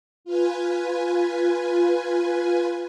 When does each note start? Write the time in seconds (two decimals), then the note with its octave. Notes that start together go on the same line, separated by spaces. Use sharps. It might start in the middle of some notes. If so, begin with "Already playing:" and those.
0.25 F4 B4 G#5